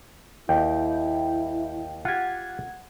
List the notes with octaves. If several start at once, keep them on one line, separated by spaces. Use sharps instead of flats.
D#2 E4 G5
F4 G4 F#5 G#6